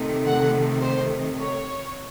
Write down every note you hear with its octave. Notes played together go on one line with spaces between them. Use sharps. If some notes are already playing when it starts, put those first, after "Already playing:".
Already playing: C3 D#3 A3
F#5
C5
C#5